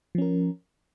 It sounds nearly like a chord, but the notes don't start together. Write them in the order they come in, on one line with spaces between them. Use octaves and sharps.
F3 C#4 A#4